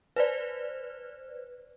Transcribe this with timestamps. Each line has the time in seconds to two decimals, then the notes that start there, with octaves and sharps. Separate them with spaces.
0.16 B4 C5 D5